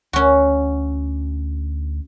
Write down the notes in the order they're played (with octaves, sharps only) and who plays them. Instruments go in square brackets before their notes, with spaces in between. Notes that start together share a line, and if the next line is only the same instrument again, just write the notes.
[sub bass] D2 [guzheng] C#4 F#4